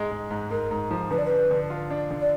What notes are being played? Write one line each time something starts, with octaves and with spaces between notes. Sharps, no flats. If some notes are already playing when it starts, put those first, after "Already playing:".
Already playing: G#2 G#3
G#3
G#2
G#2 A#4
G#2
F3
D3 B4
D5
D4 B4
D3
F4
D4
D3
D5